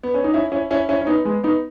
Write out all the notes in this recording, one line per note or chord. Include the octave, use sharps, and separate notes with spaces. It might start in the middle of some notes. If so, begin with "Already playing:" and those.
B3
C#4
D#4
C#4 E4
C#4 E4
C#4 E4
C#4 E4
C#4
B3 D#4
G#3 B3
B3 D#4